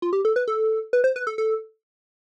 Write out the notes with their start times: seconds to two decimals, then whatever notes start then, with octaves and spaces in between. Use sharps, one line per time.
0.02 F4
0.13 G4
0.25 A4
0.36 B4
0.48 A4
0.93 B4
1.04 C5
1.16 B4
1.27 A4
1.38 A4